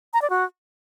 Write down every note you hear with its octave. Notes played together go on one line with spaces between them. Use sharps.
A#5
D5
F#4